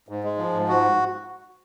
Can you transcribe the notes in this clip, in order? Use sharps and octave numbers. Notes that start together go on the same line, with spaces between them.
G#2
G#3
F3
G#2
F#4